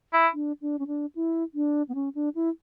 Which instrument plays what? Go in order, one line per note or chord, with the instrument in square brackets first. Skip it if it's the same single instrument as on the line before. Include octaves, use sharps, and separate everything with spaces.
[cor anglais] E4
[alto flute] D4
D4
C#4
D4
E4
D4
B3
C#4
D4
E4